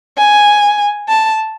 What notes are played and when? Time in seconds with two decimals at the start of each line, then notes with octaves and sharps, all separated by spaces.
0.18 G#5
1.09 A5